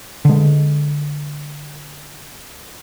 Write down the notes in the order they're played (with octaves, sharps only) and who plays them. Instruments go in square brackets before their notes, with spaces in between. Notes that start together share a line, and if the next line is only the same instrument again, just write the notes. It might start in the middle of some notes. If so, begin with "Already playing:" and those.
[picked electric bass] D3 G#3